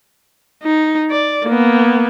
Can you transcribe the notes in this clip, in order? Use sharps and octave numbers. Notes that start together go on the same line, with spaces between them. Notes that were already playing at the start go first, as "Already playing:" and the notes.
D#4
D5
A#3 B3